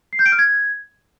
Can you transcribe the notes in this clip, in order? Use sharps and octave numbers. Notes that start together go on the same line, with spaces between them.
C7
G6
D7
F6
G#6